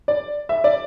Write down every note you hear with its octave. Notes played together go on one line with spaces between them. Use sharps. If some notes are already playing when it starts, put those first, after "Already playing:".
D5
E5
D5